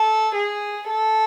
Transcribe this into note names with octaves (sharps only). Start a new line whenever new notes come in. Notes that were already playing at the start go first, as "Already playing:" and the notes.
Already playing: A4
G#4
A4